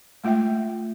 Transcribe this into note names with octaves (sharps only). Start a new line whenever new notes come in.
G#3 A3 F4 E5 G5